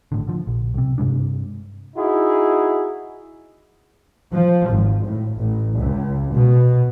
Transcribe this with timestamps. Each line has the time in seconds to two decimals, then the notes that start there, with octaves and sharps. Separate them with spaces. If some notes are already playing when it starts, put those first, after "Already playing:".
0.12 G#1 A2 D3
0.27 D3 F3
0.47 A#1
0.74 B1 C3
0.98 G2 C3 G#3 D4
1.96 D#4 E4 F#4 G#4
4.30 F3
4.69 G#1
5.05 A2
5.36 A1
5.77 C#2
6.34 B2